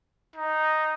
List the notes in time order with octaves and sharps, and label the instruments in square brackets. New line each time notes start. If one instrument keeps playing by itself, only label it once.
[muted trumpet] D#4